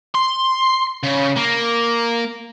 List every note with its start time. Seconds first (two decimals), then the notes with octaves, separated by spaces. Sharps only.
0.14 C6
1.03 C#3
1.37 A#3